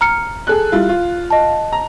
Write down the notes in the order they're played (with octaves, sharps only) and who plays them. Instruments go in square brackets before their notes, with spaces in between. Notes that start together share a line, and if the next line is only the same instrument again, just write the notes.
[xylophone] A#5 F6 C#7
[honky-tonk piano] G#4 A4 F#6
G3 E4 F4
F4
[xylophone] D#5 A5
[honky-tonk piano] A#5